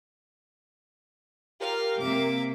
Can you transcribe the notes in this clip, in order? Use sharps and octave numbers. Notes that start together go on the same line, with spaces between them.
F4 G4 A#4 F5
C3 A#3 E5 D6